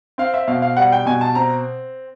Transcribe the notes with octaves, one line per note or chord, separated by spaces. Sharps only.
C4 F5
E5
B2 F5
F5
G3 F#5
G5
B2 G#5
A5
C4 A#5